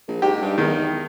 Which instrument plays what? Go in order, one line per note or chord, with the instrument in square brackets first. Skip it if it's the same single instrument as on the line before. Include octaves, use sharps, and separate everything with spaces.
[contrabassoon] A#1
[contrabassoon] G#2 [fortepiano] G4
[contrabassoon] G2
[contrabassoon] E2 [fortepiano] D#3